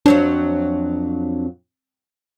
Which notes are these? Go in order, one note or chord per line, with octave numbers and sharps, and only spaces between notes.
F2 F#3 C4 D4